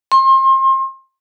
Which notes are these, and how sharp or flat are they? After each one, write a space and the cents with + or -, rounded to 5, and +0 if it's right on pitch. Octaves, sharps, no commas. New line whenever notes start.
C6 +35